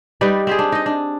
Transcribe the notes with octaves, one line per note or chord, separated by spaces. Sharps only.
G3 D#4 B4 D5
C4 G4 G#4
D4
D#4 D#5
D4